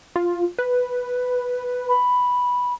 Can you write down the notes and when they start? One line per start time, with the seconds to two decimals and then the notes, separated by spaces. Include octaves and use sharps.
0.16 F4
0.59 B4
1.89 B5